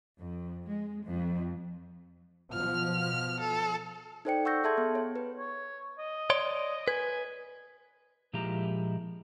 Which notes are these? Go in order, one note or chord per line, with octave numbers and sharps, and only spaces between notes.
F2
G#3
F2
B2 F3 F6
A4
D#4 A4 C5 D5 G5 C#7
F#5 C#6 E6 G6 A#6
G#4 A4 E5 A5 C6 G#6
B3
C#5
B4
C#5
D#5
C#5 D5 C6
B4 G#5
A#2 F3 G#3 E4 G4 A#5